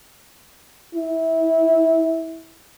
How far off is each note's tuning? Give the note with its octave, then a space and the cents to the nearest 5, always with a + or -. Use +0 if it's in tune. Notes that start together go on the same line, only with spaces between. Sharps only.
E4 -20